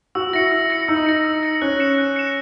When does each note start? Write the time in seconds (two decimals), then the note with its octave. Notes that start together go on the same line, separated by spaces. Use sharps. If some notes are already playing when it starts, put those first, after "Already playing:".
0.15 F#4 E6
0.33 E4 A#6 C#7
0.52 E6
0.70 A#6 C#7
0.88 D#4 E6
1.06 A#6 C#7
1.25 E6
1.43 A#6 C#7
1.62 C#4 F#6
1.80 C#7 E7
1.98 F#6
2.16 C#7 E7